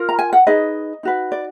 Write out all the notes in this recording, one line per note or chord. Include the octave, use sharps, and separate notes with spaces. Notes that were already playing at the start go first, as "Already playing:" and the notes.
Already playing: F4 A#4
A#5
G#5
F#5
D#4 G#4 B4 D#5
D#4 F#4 B4
D5